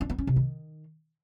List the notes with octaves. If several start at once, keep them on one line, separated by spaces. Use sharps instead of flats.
D4
B3
C#4
C3
D#3